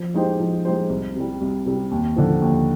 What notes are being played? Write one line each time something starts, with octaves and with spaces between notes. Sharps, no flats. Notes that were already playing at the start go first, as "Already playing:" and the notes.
Already playing: F3
G#3 D#4 G4 C5
F3
G#3 D#4 G4 C5
C2
C3 G3
C2
C3 G3
D#2
D3 F3
D#2